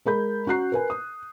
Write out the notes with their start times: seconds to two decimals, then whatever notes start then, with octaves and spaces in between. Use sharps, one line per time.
0.06 G#3 A#4 B5 G6
0.46 C#4 F#4 A#5 F#6 C7
0.72 A#4 B4 G#5
0.90 D#6